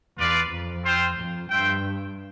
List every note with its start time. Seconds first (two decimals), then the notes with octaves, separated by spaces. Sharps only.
0.17 E2 F4 B4 D5 F5
0.50 F2
0.84 C4 F4 C5 G5
1.17 F2
1.49 G2 F4 C5 E5 G5